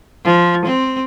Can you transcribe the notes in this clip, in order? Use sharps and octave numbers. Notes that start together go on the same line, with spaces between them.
F3
C4